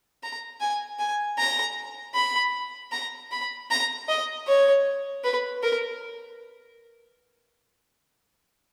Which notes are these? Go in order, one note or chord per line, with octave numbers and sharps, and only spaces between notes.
A#5
G#5
G#5
A#5
B5
A#5
B5
A#5
D#5
C#5
B4
A#4